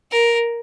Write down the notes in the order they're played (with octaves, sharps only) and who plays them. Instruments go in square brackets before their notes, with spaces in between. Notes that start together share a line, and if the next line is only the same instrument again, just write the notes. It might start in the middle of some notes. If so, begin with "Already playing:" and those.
[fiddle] A#4